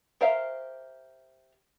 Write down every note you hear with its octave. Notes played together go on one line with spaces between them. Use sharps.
G4 A#4 C5 E5 F5